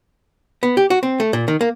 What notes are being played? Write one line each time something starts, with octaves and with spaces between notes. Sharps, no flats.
B3
G4
F#4
C4
A3
A#2
D#3
A#3